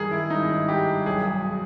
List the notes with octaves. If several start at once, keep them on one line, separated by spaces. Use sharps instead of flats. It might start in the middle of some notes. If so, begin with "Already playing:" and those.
Already playing: G2 D#3 G#4 A#4
E4
G#1 D#4
G2 G4
B1 G#4